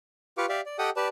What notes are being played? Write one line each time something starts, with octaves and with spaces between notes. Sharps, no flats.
F4 G4 B4 F5 C#6 D6
G4 D5 E5 F5
D5
G4 A4 D#5 F#5 G5 D#6
G4 B4 D5 A5